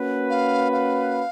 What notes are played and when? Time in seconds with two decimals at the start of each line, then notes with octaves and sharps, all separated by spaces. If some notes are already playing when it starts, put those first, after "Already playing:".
Already playing: A#3 C#4 F#4 B4
0.30 F5
0.72 F5